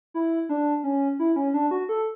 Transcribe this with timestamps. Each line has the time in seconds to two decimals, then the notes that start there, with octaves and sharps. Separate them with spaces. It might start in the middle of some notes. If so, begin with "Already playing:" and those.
0.14 E4
0.49 D4
0.84 C#4
1.19 E4
1.36 C#4
1.54 D4
1.71 F#4
1.89 A4